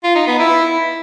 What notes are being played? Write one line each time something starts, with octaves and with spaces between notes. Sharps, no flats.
F4
D#4
B3
E4